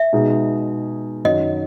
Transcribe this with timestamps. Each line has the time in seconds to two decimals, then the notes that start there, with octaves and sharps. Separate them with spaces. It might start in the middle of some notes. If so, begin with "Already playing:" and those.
Already playing: E5
0.13 B2 G#3 D#4 G#4
1.24 F#2 D#3 F#3 C#4 D#5